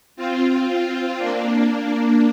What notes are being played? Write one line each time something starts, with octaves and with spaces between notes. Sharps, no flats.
C4 F4
C4 F4
A#3 D4